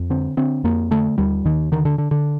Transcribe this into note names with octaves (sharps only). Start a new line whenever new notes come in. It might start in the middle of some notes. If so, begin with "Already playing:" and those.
Already playing: F2
D3 C4
D3 C4
F2 A#3
D3 A3
D#2 G3
D#2 D#3
D3 D#3
D3
D3
D3